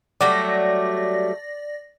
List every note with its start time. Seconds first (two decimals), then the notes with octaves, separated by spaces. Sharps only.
0.21 F#3 G3 A3 D5 A#6